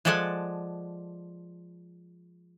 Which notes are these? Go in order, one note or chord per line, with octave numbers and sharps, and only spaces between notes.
F3 G#3 A4 D5 F#5 G#5